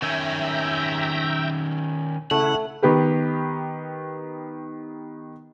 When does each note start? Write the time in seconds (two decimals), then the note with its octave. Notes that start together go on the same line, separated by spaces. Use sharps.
0.02 D#3 C#4 E5 G5 A#5
2.31 C#3 A3 E4 F#5
2.82 D#3 B3 G4 B4